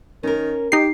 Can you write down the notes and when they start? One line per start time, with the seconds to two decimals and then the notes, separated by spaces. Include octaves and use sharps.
0.23 D#3 C#4 A#4
0.72 D#4 G4 C7